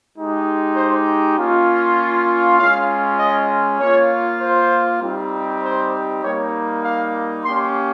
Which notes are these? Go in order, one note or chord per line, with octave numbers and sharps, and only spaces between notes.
G#3 D#4 G4
C5
A#3 C#4 F4
G#3 C#4 F4 F5
D#5
A#3 F4 C#5
C5
G3 C4 D#4 G4
C5
G3 A#3 D#4 C#5
F5
A#3 C#4 G4 C6